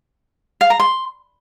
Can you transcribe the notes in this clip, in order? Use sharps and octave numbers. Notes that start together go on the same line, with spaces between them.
F5
A#5
C6